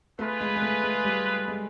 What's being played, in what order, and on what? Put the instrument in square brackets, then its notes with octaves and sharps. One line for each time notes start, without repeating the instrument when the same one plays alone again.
[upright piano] A3 [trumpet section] F4 G#4 B4
[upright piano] G#3
G#3
A3
G#3
G3
G#3